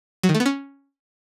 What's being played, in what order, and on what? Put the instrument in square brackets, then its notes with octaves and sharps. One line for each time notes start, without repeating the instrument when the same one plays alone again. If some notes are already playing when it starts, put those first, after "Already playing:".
[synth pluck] F#3
D#3
A3
B3
C#4